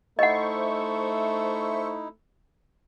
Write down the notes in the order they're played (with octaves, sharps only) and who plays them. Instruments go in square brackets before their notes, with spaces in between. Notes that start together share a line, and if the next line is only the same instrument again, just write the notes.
[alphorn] A3 [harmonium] D#4 E4 [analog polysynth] C5 E5 C#6 [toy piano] D#5 F#5